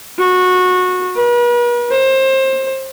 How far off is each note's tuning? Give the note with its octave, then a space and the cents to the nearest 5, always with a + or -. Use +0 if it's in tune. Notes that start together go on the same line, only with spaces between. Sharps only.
F#4 -20
B4 -45
C5 +25